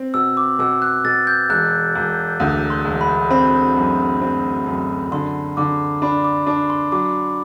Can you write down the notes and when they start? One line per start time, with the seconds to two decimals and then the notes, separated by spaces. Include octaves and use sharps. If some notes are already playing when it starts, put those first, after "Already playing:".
Already playing: C4
0.14 B2 E6
0.37 D6
0.59 B2 E6
0.82 F#6
1.05 B2 A6
1.27 G6
1.49 E1 F#6
1.95 E1
2.40 D2
2.70 C6
2.85 E1
3.01 B5
3.30 C4 B5
3.77 F#2
4.22 C4
4.66 F#2
5.12 D3 C6
5.57 D3 D6
6.02 D4 B5
6.24 D6
6.47 D4 D6
6.70 C6
6.92 F#3 D6